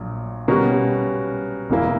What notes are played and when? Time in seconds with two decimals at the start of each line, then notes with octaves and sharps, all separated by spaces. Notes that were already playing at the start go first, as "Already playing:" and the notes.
Already playing: A#1 A#2 F#3
0.48 B2 G3 C#4 F#4 A#4
1.70 E1 E2 B2 A#3 E4